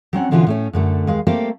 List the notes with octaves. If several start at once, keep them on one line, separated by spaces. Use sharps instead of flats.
F#3 C4 C#4 F#5
B2 D3 E3 B3 C#4 F4
A2 A3 C#4
F#2 D3 A3
D#2 G#3 F5
A3 A#3 C4 G4 C5 F5